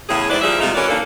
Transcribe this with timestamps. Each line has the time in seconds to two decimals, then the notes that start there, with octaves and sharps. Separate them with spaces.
0.09 E2 A2 C#3 G#4
0.30 G#2 E4 B4 C5 D5
0.42 A#2 F3 G3 G#4 E5
0.60 C3 G#3 A3 D#4 F4
0.75 E3 C#4 F#4 A#4 C#5 D5
0.89 A#2 C#3 A#3 D4 D#4 A4